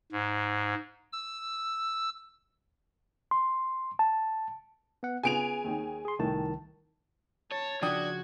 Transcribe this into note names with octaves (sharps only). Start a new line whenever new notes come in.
G#2
E6
C6
A5
B3 F#5
C#3 B3 F4 G#4 G#5 D7 F7
D#2 D#3
G#4 C6
C2 A2 D#3 A5
C#5 A5
C#3 F3 D4 F#4 G5 D#6 G#6